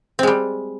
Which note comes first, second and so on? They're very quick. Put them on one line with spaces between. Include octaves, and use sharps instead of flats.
C4 G#3 G3